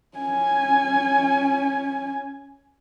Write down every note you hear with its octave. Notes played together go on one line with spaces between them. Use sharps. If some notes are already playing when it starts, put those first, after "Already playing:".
C#4 G#5